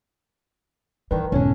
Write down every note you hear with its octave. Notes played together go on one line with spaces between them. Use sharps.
G2 D#3 E3 B4
E1 F2 G#2 D3 C#4 C#5 G#5